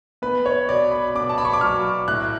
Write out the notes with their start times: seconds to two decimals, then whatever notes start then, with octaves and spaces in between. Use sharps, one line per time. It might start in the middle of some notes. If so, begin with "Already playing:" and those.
0.22 B3 B4
0.46 C#5
0.69 B2 D5
0.92 B5
1.15 B2 D6
1.29 A5
1.38 B5
1.45 C#6
1.53 D6
1.61 F#3 F6
2.08 A2 F#6